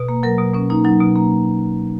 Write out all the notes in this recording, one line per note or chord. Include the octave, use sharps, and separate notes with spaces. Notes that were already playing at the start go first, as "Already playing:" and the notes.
Already playing: B2
A#3
F#3 A#4
B2
B2 C#4
A#3 D#4
F#3 D#4
B2
A#3